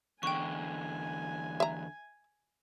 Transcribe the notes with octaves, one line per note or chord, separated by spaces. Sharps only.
E2 D3 G5 G#5 C#6
E5 A#5